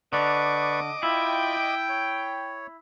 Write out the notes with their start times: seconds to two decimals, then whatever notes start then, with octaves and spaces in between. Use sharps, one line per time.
0.13 D3 B4 D5 D#5 C#6 D6
1.03 E4 F4 G5
1.89 C#5